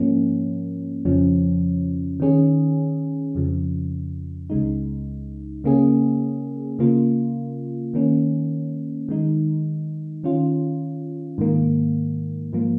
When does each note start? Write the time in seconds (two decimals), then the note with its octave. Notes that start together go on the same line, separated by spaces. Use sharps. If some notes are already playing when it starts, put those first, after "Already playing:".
Already playing: G#2 F3 A#3 C#4
1.05 F2 C#3 F3 C#4
2.20 D#3 C#4 G#4
3.35 F2 C#3 F3
4.50 C#2 C#3 G#3 D#4
5.64 C#3 A#3 C#4 G#4
6.79 C#3 A#3 F4
7.94 D#3 A#3 C#4
9.09 D#3 G#3 D#4
10.24 D#3 C#4 F4
11.38 G#2 D#3 A#3
12.53 G#2 F3 A#3